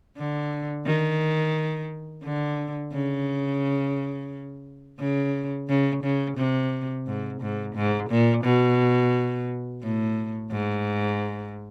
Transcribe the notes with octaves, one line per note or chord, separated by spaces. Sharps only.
D3
D#3
D3
C#3
C#3
C#3
C#3
C3
G#2
G#2
G#2
A#2
B2
A2
G#2